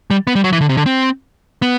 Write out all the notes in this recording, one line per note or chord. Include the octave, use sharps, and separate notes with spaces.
G3
B3
G3
F#3
E3
D3
C3
D3
C4
B3